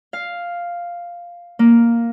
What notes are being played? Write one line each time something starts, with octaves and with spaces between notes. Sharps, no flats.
F5
A#3